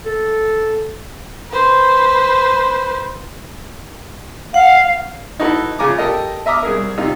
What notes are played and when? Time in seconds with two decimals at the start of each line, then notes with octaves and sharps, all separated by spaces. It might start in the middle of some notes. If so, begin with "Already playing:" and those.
0.06 A4
1.51 B4 C5
4.54 F5 F#5
5.40 D#4 E4 F#4 A4 B4
5.79 C#3 F4 G#5 A#5 D6
5.98 G4 A4 A#4 D#5
6.46 D#5 E5 A#5 D6 D#6 F6
6.63 C2 G#4 A#4
6.98 C3 D#4 F4